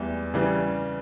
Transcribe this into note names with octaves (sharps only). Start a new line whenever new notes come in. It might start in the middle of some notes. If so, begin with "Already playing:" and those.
Already playing: E2 E3 G3
C#3 E3 G3